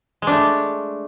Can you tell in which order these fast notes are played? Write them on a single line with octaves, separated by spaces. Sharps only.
G#3 D4 A3